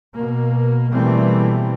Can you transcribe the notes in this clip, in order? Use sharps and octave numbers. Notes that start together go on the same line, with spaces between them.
B2 A#3
B2 E3 G3 A3 A#3 C4